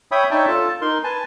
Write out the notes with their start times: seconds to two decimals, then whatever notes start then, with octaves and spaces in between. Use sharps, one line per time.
0.12 C#5 E5 G5 B5 D#6
0.31 D4 D#4 C#5 E5 G5 A5
0.48 F4 A4 A5
0.81 D#4 A#4 C6
1.04 B4 G#5 A5